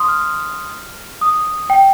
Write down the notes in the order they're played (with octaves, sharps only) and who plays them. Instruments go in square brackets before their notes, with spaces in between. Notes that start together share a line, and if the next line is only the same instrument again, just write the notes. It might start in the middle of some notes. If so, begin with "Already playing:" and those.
Already playing: [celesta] C6 D#6
F6
D#6
G5